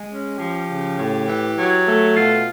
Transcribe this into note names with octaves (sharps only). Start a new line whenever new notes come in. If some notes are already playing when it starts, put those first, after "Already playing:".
Already playing: G#3
C#4
F3 G4
C#3
A2
E3
F#3
A3
B2 F4